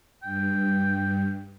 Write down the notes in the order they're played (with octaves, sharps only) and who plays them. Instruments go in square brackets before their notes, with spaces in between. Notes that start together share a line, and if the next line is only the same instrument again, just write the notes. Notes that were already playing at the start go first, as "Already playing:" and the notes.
[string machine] G2 [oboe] G5